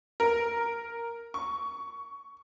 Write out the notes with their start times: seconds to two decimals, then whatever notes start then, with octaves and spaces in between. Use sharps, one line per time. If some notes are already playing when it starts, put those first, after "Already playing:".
0.20 A#4
1.34 C#6